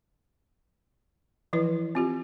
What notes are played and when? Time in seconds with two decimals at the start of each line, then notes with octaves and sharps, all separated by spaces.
1.53 E3 F3 E4 B4
1.95 C4 F4 G4